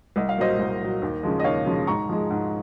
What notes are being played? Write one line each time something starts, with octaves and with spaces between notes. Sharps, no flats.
C2 D#5
F5
A#2 F#3 C5 D#5
C2
A#2 F#3
D#2
C#3 F3 G#3
D#5
D#2 C#5 F5
C#3 F3 G#3
G#2 A#5 C#6
F3 G#3
G#2